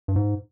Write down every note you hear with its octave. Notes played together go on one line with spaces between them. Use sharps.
G2
G#2